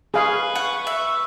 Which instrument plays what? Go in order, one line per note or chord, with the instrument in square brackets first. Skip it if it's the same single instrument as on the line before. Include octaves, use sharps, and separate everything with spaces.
[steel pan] G#4 F5 [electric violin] B4 C#6
[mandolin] F#5
E5